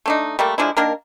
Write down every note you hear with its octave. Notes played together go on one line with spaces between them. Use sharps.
A3 D4 D#4
G3 A3 A#3
F3 G#3 D4 E4
D#3 A#3 D4 A#4